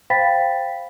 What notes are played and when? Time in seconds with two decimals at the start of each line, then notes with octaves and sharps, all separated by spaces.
0.10 C5 F5 G5 B5 A6 B6